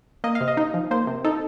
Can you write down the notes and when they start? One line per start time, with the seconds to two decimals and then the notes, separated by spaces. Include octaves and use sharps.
0.24 A#3 D#5
0.35 F5
0.40 C3
0.48 D#5
0.57 D#4
0.74 F3
0.91 A#3 C5
1.07 C3
1.25 D#4 A4